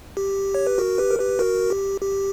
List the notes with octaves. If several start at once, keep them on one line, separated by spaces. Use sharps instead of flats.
G4
C#5
B4
F#4 A#4
G4 B4
A#4
G4 B4
F#4 A#4
G4
G4